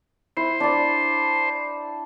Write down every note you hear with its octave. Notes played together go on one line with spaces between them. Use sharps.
E4 C5
D4 D5